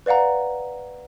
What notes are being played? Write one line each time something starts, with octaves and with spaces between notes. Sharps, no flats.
B4 D5 F5 F#5 A#5